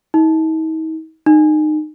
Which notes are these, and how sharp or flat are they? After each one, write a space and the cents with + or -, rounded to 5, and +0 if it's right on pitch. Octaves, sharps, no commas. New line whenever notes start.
D#4 +45
D#4 -25